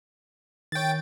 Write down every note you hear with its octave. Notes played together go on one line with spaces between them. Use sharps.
D#3 C#5 G5 A6